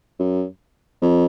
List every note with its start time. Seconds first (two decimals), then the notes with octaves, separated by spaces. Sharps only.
0.19 F#2
1.02 F2